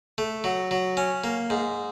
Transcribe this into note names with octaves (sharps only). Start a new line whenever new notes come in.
A3
F#3
F#3
C#4
A#3
G#2